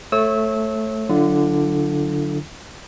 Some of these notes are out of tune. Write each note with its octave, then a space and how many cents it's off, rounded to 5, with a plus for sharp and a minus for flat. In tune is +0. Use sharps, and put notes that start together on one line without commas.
A3 +0 C#5 -30 E6 -25
D3 +0 F#3 -10 F4 -45